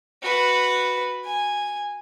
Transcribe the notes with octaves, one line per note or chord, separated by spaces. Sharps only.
F#4 B4
G#5